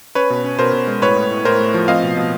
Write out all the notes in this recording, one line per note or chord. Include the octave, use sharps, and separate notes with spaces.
C#4 B4 C#5
B2
C#4
B2 A#4 C5
B2
G#3
A2 B4 C#5
A2
A2
A2 A#4 C5
A3
F3
C4 D#5 F5
B2
B2